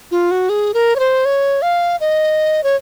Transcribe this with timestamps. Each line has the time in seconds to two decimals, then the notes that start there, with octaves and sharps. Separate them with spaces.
0.11 F4
0.31 F#4
0.49 G#4
0.74 A#4
0.96 C#5
0.99 C5
1.25 C#5
1.62 F5
2.00 D#5
2.64 C#5